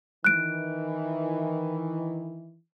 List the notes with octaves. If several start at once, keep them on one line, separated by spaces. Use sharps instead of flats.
D#3 E3 F#6 D7